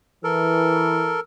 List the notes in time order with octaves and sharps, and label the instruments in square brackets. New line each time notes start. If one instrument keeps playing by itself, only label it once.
[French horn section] E3 [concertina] A4 A#4